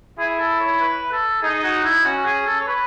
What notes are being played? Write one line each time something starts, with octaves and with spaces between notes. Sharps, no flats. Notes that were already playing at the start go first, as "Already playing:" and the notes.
E4 G#4
A4
C#5
B4
A4
D#4 G#4
F#4
E4
C#4 F#4
G#4
A4
C#5
B4